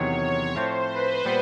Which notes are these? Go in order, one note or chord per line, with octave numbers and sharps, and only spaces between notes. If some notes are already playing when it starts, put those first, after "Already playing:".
Already playing: E2 C3 D#3 F#3 C#5
A2 F3 A3 C4 C5
B4
A#2 G3 B3